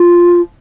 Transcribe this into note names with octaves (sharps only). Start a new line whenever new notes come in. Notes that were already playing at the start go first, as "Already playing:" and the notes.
Already playing: F4